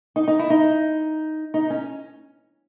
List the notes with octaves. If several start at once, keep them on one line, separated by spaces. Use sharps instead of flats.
D#4
D#4
E4
D#4
D#4
C#4